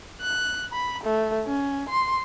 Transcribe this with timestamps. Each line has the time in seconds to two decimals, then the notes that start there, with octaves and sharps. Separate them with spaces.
0.21 F#6
0.73 B5
1.03 A3
1.46 C#4
1.89 C6